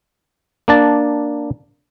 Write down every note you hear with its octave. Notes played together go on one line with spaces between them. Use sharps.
A#3 D4 A5